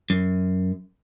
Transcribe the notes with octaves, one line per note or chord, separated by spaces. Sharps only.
F#2